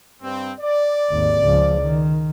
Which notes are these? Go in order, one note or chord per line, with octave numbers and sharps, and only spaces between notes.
G2 C4
D5
G#1 D#2
C#2 F3
D#3